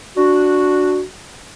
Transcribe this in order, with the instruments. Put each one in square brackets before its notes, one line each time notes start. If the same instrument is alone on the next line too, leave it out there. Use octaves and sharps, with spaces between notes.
[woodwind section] D4 F#4